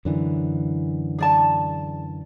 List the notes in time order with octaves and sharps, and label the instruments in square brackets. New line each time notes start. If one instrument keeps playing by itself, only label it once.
[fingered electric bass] F#2 D3 E3
[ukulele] G#4 D5 A5